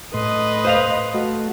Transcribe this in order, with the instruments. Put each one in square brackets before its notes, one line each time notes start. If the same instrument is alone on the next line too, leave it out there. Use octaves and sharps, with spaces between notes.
[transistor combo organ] A2 C6 [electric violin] B4 D#5
[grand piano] C5 F5 F7
[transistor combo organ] A3 F#4